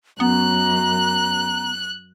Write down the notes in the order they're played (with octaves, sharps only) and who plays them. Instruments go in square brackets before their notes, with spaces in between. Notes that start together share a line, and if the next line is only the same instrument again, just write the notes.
[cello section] F#2 [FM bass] B3 [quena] A#5 [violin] F#6